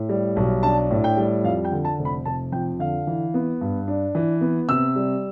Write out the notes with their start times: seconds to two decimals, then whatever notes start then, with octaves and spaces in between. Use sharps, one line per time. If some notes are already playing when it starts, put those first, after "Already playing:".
Already playing: A2
0.09 G3
0.36 B1
0.63 D4 A5
0.90 A2
1.04 G5
1.17 G3
1.44 F2 F5
1.64 G5
1.72 D3
1.85 A5
1.99 F1
2.05 B5
2.25 F1 A5
2.52 F2 G5
2.79 D3 F5
3.07 E3
3.34 B3
3.61 G2
3.88 D4
4.15 E3
4.41 B3
4.69 C3 E6
4.96 G3